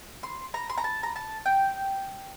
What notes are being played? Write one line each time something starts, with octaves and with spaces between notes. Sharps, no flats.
C6
A#5
C6
A#5
A5
A#5
A5
G5